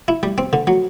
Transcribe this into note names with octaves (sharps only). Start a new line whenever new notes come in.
E4
G3
C4
D3
F#3